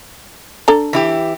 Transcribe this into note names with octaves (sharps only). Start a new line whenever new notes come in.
D4 A4 A#5
E3 E4 G4